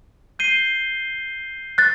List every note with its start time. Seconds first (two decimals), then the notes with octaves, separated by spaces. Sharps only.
0.39 G6 C7 D#7 G7
1.78 F#6 A6